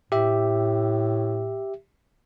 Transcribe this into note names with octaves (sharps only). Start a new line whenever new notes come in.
A2 G4 E5